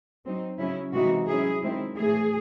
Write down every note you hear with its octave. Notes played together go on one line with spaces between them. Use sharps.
F#3 C4 D#4
C#3 F#3 C#4 E4
C3 E3 G#3 D#4 F#4
F#3 C#4 E4 G#4
D#3 G#3 C4 E4
A2 E3 A3 G#4